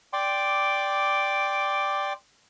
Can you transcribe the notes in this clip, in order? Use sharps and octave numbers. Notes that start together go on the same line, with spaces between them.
D5 G5 C6 D6